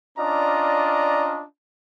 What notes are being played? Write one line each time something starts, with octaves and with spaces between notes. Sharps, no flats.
C#4 D4 F4 D5 D#5 A#5